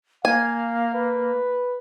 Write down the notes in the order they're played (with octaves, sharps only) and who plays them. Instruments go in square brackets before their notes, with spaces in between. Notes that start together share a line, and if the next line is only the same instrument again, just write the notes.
[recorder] A#3 [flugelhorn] F5 [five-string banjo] G#5
[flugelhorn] B4